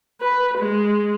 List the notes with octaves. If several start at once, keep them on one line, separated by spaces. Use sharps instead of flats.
B4
G#3